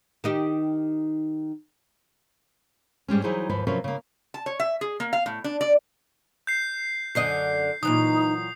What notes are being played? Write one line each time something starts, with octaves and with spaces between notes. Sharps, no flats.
D#3 D#4 G4
G#2 G3 G#3 C#4
E3 F#3 D#4 E4 G#4 C5
D#2 G#2 F3 B4 C5
C3 F3 F#3 C#4 A#4 B4
C#3 A#3
A5
C#5
E5
G#4
A#3
F5
A2
D4
D5
G6 C7
F#2 D3 D#5 C7
A#2 E3 F#3 D#4 D#6